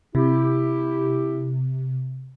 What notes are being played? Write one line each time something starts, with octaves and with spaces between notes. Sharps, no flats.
C3 E4 G4